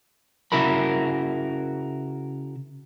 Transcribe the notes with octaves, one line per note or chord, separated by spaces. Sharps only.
C#3 E4 F#4 A#4 B5